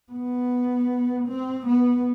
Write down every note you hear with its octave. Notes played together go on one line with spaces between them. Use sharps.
B3
C4
B3